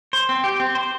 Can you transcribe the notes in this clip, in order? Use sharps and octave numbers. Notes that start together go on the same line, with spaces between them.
C5
C4
G4
C4
C5